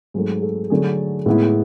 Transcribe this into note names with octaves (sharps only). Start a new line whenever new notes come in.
G#2 F#3 A3 G#4
A4
D3 F#3 A3 G#4
A2 G#3 B3 E4